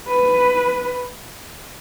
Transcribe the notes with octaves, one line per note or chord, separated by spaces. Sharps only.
B4